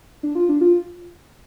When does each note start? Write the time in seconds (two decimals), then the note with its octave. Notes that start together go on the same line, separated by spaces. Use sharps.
0.23 D4
0.35 F4
0.49 D4
0.61 F4